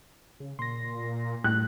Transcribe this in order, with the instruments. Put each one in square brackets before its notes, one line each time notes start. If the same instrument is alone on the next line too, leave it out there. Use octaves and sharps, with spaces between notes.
[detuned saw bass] C#3
[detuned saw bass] A#2 [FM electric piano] C6 A#6
[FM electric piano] A2 [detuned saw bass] G3 [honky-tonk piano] F#6